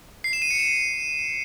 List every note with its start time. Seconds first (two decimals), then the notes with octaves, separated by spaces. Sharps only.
0.24 C7
0.33 E7
0.42 D#7
0.51 C#7
0.59 E7